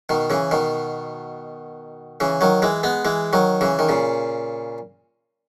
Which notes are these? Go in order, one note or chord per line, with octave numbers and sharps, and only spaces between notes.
B2 D#3
C#3 E3
B2 D#3
C#3 E3
D#3 F#3
E3 G#3
G#3 B3
E3 G#3
D#3 F#3
C#3 E3
D#3
A#2 C#3